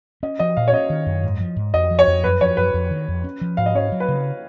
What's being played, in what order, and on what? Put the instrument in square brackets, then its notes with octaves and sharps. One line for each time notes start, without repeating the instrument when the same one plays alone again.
[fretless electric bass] C#4 [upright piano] D#5
[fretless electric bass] F3 [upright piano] D#5
[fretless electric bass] A#2 [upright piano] F5
[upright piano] C#5
[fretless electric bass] C#4 [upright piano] D#5
[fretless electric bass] D#3
F#2
G#2
F3
G#2
[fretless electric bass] F2 [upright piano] D#5
[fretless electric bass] F3
[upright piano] C#5
[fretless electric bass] F2
[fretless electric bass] F#2 [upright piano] B4
[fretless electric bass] F3 [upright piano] C#5
[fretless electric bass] F#2 [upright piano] B4
[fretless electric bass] F2
D#3
F2
C#4
F3
[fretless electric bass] G#2 [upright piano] F5
[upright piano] D#5
[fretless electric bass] C#4 [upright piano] C#5
[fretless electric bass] F#3
[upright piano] B4
[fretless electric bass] C#3